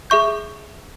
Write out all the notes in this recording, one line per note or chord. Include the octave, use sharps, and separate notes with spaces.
G#4 E5 C#6 G6